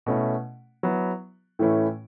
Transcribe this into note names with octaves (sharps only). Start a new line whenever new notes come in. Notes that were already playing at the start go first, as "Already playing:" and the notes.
B2 A3 C#4 E4
F#3 B3 E4
A2 E3 A3 C#4 E4